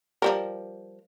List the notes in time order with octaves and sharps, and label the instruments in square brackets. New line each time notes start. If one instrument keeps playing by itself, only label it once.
[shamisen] F3 G3 A#4